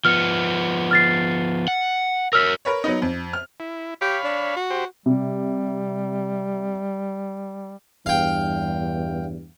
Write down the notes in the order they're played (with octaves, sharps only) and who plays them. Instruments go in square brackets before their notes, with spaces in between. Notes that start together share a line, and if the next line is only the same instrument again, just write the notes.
[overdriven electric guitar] F3 B3 [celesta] F6 C#7
[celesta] F6 A6 C7
[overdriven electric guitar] F#5
[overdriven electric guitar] A#4 C#5 [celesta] E6 F6 B6
[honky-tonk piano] A#4 B4 C#5
F#3 B3 D#4
F2
F6
[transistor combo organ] E4
[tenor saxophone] G4 [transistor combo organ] C#5 F5 B5
[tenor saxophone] D4
F#4
[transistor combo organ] G4 C5
[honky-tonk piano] C3 [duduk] G3
[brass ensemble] E2 G2 [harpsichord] F5 G5